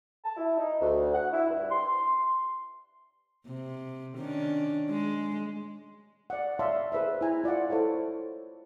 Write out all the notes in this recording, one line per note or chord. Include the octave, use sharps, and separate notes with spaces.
A5
E4
D#4
D2
F#5
E4
G2
C6
C3
D#3 C#4 D4
G#3
D5 F#5
C#5 D5 E5 F5 A5 C6
G#4 B4 C5 E5
E4 G#5 A#5
F4 D5 E5 F#5
E4 A4 C5 C#5 F5